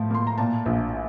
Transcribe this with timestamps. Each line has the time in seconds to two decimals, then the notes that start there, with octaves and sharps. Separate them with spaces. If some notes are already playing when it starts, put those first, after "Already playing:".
Already playing: A2 F3 A5
0.10 A#3 C6
0.27 A#5
0.38 A#2 A5
0.66 A#1